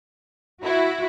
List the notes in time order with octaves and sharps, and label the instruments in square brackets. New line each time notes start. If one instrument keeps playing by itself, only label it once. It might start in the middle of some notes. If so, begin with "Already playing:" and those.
[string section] E4 [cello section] F#4